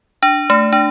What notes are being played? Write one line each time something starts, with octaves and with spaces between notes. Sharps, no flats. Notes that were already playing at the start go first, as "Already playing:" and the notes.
D4
A3
D4